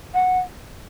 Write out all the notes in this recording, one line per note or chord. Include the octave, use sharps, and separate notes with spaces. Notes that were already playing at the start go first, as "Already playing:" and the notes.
F#5